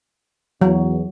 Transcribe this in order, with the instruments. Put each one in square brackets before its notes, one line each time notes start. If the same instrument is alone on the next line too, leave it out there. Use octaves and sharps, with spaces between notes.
[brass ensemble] E2 [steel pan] F#3